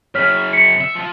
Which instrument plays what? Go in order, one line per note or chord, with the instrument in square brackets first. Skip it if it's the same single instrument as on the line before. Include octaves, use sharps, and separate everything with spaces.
[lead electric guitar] F#2 C#3 [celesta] C#5 F6 B6
[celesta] B6 C#7
[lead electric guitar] E5
F3 F4